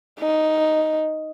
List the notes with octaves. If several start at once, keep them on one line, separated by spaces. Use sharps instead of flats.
D#4